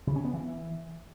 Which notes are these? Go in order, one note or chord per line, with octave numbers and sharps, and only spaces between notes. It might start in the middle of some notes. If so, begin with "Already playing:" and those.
C#3
C#4
B3
E3